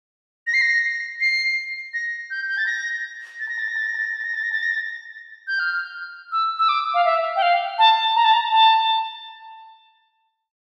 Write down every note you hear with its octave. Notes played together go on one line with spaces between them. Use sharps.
A#6
C7
A#6
C7
A#6
G6
G6
A6
A#6
A6
A#6
A6
A#6
A6
A#6
A6
A#6
A6
A#6
A6
A#6
A6
A#6
A6
G6
F6
E6
E6
D6
F5
E5
G5
F5
A5
A#5
A5
A#5
A5